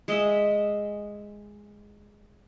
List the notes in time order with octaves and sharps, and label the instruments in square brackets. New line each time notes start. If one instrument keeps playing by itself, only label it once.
[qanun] G#3 D#5 E5